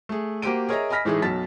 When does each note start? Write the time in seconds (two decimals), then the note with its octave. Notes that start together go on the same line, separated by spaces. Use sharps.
0.09 A3 G#4
0.42 A#3 F#4 G4 C5 D7 D#7
0.69 G#4 A#4 C#5 D#5 E5 A#5
0.90 D#5 G#5 B5 F6 A#6 B6
1.05 A2 E3 G#3 A3 D#4 G#4
1.22 B1 F#2 A5 A6 B6